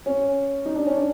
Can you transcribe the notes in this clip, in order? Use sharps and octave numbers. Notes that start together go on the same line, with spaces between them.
C#4
D#4
D4
C#4
D4